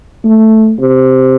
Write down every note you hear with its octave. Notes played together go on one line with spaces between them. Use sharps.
A3
C3